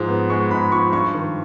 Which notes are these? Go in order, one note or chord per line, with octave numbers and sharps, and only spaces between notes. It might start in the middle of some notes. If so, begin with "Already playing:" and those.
Already playing: G#2 F3 A#5
B3
G#3 C#6
G#2 B5
F3 C#6
G2 C#6
D#3